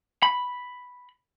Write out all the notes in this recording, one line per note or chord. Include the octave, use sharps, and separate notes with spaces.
B5